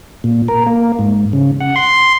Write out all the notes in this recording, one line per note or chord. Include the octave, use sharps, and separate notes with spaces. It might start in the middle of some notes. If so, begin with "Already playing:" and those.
A#2
A#4
A#3
G#2
C#3
F#5
C6